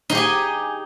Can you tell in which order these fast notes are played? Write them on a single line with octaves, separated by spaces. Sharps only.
D#4 G#4 G4 G#5